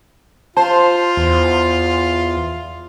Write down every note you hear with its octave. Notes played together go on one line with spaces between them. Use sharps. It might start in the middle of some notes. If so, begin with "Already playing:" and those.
F4 C5 A5
E2